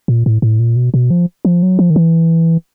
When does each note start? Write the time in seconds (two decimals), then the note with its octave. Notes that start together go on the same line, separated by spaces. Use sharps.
0.08 A#2
0.26 A2
0.42 A2
0.59 A#2
0.76 B2
0.94 B2
1.11 F3
1.45 F3
1.63 F#3
1.79 F3
1.90 D#3
1.96 E3